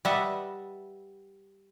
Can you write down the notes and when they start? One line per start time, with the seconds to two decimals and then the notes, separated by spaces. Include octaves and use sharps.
0.05 G3 B4 D#5 E5 F#5